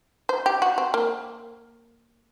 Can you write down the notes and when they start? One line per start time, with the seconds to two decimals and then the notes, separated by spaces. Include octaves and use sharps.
0.29 C5
0.46 G4
0.62 F#4
0.78 C4
0.94 A#3